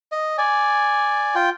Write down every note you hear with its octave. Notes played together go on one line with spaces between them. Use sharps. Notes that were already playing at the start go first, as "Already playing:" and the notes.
D#5
D5 G#5
F4 G5